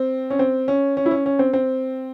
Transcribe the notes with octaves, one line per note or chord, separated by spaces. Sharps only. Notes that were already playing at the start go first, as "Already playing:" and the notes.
Already playing: C4
C#4
C4
C#4
C#4
E4
C#4
C#4
C4
C4